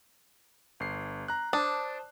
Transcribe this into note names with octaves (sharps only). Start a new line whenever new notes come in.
G1 C7
A#5 F#6
D4 C5 A5 D#6